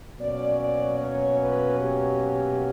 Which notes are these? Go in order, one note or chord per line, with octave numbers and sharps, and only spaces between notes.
B2 F#3 A#3 C#4 D5
D5
C#5
B4
G4